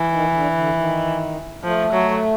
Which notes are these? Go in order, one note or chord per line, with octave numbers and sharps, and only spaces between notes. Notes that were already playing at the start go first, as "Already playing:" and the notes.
Already playing: E3
D#3
D3
D3
D#3
F3 A3
F#3